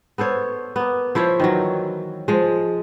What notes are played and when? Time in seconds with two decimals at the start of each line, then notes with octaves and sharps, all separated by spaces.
0.18 B3 A4 C5 C#5
0.76 A#3 B3
1.15 F3 E4 C5 C#5
1.40 D#3 E3 F#3
2.28 F3 G#3